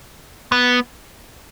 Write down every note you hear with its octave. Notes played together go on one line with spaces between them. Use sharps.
B3